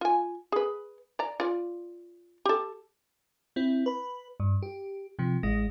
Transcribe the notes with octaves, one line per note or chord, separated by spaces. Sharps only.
F4 G#5
G#4 B4
D5 A#5
F4 D5
G4 A4
C4 E4
B4 B5
G2
G4
C3 F3
A1 G#3 A#6